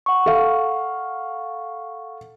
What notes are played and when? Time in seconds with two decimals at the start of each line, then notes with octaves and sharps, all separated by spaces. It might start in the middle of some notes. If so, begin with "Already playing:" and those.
0.06 F#5 C#6
0.26 A4 F5